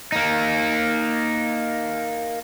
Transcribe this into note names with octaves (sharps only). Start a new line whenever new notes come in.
A#3 D#4